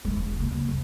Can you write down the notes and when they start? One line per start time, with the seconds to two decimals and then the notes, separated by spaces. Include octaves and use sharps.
0.05 D#3 G#3
0.16 E1
0.36 C#3 A#3
0.52 C#3 A#3
0.69 F2 C3